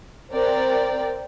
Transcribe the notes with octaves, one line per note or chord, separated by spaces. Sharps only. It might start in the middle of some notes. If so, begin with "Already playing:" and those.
C4 A#4 D5 G5